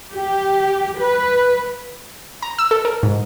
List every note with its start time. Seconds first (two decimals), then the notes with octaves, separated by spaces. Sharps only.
0.13 G4
0.98 B4
2.42 A#5
2.58 E6
2.71 A4
2.85 A#4
3.03 G#2